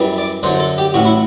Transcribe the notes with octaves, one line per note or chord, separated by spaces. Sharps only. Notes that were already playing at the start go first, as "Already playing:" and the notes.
Already playing: F#2 E3 G3
D5
F#2 D3 F#3 C5
A4
G4
A1 A2 F#3 F#4
E4